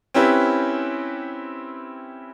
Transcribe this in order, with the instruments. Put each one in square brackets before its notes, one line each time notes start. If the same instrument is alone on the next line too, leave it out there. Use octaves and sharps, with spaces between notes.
[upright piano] C4 C#4 E4 G4 B4